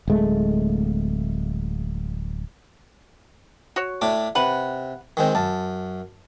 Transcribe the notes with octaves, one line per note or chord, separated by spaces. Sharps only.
D1 G#3 A3
F#4 C#5
A2 D4 D6
C3 B4 F#5
D#3 G#3 C4
F#2 A5